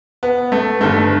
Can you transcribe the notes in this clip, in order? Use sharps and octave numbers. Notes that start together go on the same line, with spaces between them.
B3
A3
G1 G2 D#3 A3